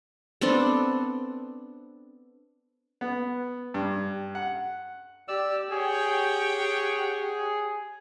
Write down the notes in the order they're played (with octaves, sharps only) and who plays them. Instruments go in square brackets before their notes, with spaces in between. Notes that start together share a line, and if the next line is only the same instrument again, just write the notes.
[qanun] B3 C4 D4 A4
[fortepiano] B3
G2
F#5
[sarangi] G4 [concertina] D5 E6
[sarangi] G4 [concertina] G#4 [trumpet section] C#5 F#5 G5